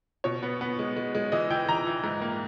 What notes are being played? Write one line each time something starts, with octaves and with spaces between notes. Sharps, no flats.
B2 C#5
B3
B3
G#3
G#3
G#3
E3 D#5
E3 G5
E3 A#5
E3
G#2
A#3